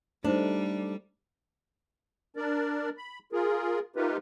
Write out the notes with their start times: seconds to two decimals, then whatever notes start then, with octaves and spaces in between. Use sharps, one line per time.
0.24 G3 A3 D4 D#4 G#4 C5 E5
2.36 D4 A#4 D5
2.97 B5
3.32 F4 G#4 A#4
3.96 A3 D#4 F4 G4 A#4 B4